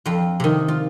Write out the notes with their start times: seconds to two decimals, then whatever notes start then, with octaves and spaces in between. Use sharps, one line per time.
0.06 F2 F4
0.40 C3 D#3
0.68 F4